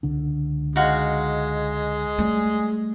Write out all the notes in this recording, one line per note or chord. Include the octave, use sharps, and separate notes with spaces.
C#2 D3 D4
G#3 D#4 F#4 F5
G3 A3